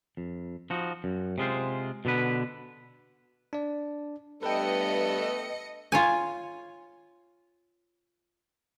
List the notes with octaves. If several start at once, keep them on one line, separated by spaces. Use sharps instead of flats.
F2
F3 D#4 F#4
F#2
C3 G#3 F4 C5
B2 D3 B3 B4
D4 D5
G2 A3 B3 A4 B4 D#5 G5 C#7
F4 C#5 G#5